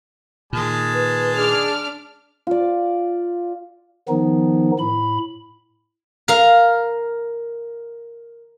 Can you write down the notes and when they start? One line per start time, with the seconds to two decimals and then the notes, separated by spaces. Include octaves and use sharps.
0.53 A#2 D#3 G#3 A5
0.94 B4
1.37 D4 G#4 D6 F6
2.47 F4 D5
4.09 D#3 F3 B3 D#4
4.79 A2 B5
6.28 A#4 F5